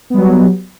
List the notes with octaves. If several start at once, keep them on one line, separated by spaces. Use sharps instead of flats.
F#3 G3 B3